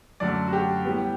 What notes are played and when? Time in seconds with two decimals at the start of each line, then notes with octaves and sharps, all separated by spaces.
0.20 F#2 D3 F#3 A3 D5
0.48 F#4
0.53 G4
0.85 A2 G3 B3